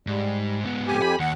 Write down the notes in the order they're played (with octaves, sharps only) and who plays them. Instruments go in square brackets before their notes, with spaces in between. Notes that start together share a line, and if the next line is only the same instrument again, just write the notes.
[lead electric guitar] G#2 [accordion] G3
[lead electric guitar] G#2 B3
[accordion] F2 G4 G#5
[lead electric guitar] B5
[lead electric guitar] D#2 [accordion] F#5